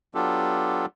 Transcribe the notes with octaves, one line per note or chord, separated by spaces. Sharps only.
F#3 B3 D4 F4 G4 A4